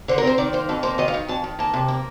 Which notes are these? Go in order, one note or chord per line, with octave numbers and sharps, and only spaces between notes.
D3 C5
A#4
C4 C5
D#3 D5
A#3 C5
F2 A4
A#3 C5
D#3 D#5
F5
D#3
F2 A5
D#3
A#3 A5
C3
A#3